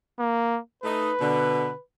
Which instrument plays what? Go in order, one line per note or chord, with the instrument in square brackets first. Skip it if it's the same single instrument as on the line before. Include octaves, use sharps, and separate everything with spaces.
[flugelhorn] A#3
[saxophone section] A3 D#4 [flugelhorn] B4
[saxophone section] B2 D3